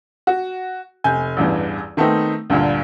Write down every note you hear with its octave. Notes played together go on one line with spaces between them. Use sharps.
F#4
F1 G#5 G6
A1 E2 G2 E3
D#3 A3 B3 C4 D#4
D2 G2 A#2 D3